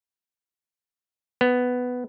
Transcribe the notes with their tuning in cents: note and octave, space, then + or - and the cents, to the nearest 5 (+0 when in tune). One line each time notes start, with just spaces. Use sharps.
B3 +5